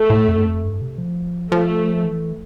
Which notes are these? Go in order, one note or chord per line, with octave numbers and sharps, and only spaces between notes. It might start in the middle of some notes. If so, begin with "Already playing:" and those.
Already playing: A3
A2
F2
G2
F2
G2
C3
F3
F3 A3
E3